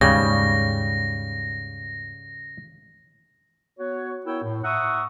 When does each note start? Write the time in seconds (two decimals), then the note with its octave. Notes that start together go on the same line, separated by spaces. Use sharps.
0.01 D#2 G#2 C#3 G3 A#6
3.79 B3 F#4 C#5
4.26 B3 E4 A#4 C#5 G5
4.44 A2
4.64 E5 F#5 A#5 C#6 D#6